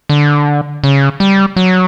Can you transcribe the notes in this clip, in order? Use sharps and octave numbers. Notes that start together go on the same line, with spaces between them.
D3
C#3
G3
F#3